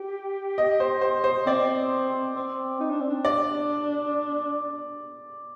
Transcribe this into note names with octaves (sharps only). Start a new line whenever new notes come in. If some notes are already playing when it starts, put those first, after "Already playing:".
Already playing: G4
D#5
C5
C5
C5
C4 D5
C4
D#4
D4
C4
D4
D5